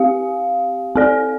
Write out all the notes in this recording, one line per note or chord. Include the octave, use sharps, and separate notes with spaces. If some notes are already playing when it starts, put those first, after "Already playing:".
Already playing: C4 G4 F5
C4 A4 D5